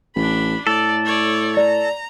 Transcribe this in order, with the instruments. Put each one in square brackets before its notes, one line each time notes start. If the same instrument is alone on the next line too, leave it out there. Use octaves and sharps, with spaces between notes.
[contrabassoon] A1 [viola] D4 B5
[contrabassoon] A2 [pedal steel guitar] A4 [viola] D5
[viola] C#5 D5
[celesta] D5 [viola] A#5